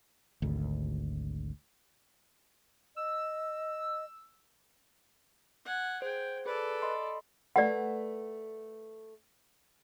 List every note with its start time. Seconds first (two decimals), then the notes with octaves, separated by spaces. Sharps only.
0.42 G#1 D2
2.96 D#5 E6
5.65 F#5 G#5
6.02 G#4 C5 G5
6.46 G#4 A4 B4 D5
6.82 D#5 B5 C6
7.56 A3 B4 D5 F#5